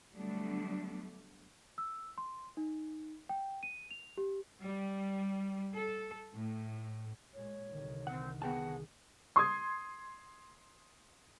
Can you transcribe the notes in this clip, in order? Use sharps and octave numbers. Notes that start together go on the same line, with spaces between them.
D3 F#3 G3 A3 B3 D4
E6
C6
D#4
G5
D#7
F7
G4
G3
A4
A2
A#2 G#3 C#5
C2 D3 D#3
C4 F#5
B3 G#4 F#5 G5 A5
C6 D#6 G#6